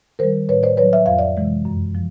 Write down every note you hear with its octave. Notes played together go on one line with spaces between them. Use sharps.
D#3 G3 A#4 C5
A2 B4 C#5
C5 D5
F#3 B4 C#5
E5
F2 F5
D5 E5
C3 E3 G#3
F#2
F3